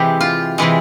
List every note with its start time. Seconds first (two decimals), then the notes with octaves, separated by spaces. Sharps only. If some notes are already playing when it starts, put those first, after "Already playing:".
Already playing: C3 E3 G#3 G4
0.21 F4
0.58 C3 E3 G#3